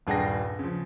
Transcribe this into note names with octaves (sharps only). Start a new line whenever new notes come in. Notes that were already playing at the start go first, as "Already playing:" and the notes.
D#1 G2 G#4 F#5 G5 A#6
C#3 F3